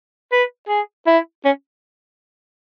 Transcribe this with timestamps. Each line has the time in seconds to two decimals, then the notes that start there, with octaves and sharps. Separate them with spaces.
0.32 B4
0.69 G#4
1.06 E4
1.45 C#4